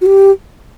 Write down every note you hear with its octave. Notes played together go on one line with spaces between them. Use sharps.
F#4
G4